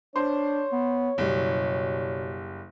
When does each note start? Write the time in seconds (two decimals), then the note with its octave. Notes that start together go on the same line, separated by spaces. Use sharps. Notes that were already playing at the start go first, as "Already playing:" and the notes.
0.16 D4 C5 C#5
0.72 B3
1.18 F#1 B2 G3